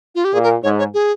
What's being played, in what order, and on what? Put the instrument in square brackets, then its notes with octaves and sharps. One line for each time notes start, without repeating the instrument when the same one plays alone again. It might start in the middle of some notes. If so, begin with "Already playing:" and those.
[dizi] F4
G4
[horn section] A#2 [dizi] G#4
[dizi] A#4
[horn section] G#2 [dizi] C#5
[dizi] C#5
G#4